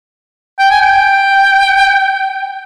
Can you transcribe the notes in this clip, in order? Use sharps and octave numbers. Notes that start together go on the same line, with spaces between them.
G5
G#5
G5